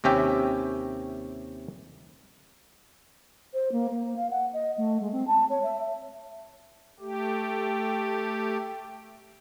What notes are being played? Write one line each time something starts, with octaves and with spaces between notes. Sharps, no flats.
D#2 C3 C#4 G4 E5 G5
C5
A#3
A#3
F5
F#5
D#5
A3
G#3
C4
A5
C#5
E5
A3 G4